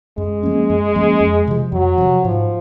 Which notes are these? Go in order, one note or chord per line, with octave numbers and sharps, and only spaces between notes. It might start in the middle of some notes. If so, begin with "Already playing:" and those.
F#2 G#3
F3 A#3 C#4
F#2
F3 A#3 C#4
F2
C3 F3
F2 F#3
C3 F3
G#2 F3